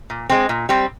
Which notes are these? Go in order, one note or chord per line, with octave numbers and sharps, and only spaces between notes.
A#2
G#3 C4
A#2
G3 C4